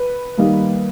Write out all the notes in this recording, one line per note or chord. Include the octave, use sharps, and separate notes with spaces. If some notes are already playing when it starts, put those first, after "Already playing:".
Already playing: B4
D#3 G3 A#3